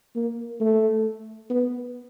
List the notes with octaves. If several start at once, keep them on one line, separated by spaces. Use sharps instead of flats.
A#3
A3
B3